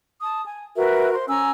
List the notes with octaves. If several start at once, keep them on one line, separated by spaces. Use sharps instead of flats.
A5 D#6
G#5
F#4 A#4 B4 E5
C5 C6
C#4 G#5 A#5 E6